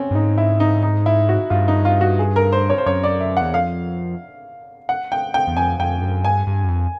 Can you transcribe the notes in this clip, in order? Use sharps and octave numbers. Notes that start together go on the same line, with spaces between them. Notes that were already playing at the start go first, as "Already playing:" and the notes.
Already playing: C4 C#4
G2
G#2 D#4
E4
D#4
D#4
E4
F#4
G2 F4
D#4
F4
F#4
G#4
A#4
C5
C#5
C5
F#2 C#5
D5
E5
E2 F#5
F2 F5
F#5
G5
G5
E2
F2 G#5
F2 G5
F#2
G2 G#5
G2
F#2
F2